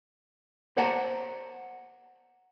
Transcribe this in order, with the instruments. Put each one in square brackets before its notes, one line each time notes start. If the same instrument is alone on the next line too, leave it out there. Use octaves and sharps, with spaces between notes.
[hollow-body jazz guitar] C5 D5 F#5 A5 A#5